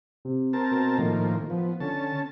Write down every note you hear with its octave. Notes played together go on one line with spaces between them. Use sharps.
C3
C4 A#4 A5
B2
A2 D#3 F3 A#3
F3 B3
D3 C#4 A5